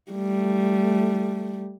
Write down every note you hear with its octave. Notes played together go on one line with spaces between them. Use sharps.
G3 A3